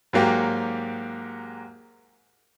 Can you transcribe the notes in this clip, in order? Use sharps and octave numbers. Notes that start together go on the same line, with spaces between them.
G#2 F#3 A#3 G4